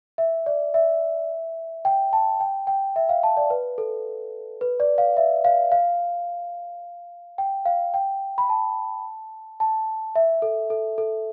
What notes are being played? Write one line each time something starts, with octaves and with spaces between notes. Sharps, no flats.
E5
D5
E5
G5
A5
G5
G5
E5
F5
A5
D5
B4
A4
B4
D5
F5
E5
F5
F5
G5
F5
G5
B5
A5
A5
E5
A4
A4
A4